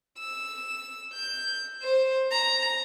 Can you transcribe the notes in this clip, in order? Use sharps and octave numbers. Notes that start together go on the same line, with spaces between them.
E6
G6
C5
A#5